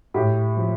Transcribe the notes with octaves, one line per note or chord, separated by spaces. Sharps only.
A2 G4
F3